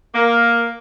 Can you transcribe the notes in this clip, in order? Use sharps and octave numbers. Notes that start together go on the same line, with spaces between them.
A#3